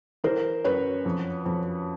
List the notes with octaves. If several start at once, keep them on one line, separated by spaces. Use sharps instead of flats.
E3 A#4 C5
F#2 B4 C#5
F2
F2